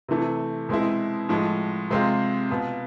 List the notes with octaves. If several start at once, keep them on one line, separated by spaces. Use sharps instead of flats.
C3 E3 A3
B2 G#3 C4 E4
A2 F3 G#3
C3 G#3 C4 F4
B2 B3 F4